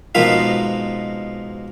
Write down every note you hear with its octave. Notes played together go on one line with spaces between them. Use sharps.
G#2 B2 F3 A#3 F4 B5